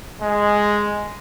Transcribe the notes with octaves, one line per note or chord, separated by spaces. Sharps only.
G#3